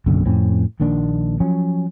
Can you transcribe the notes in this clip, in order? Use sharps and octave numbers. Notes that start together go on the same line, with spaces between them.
F#1 B1 F#2 D3
F2 A2 C4 C#4
A#1 D#3 A#3 D4
F3 F#3 C#4